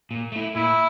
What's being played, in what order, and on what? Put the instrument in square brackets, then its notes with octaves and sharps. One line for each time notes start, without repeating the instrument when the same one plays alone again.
[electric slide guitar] A#2
A3 E4
[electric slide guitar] A#2 [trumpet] E4